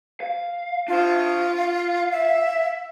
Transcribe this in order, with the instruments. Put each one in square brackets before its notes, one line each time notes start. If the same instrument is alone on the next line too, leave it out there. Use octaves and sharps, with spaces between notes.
[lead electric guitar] F5
[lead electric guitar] D4 C5 [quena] F4
[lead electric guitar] F5
[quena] E5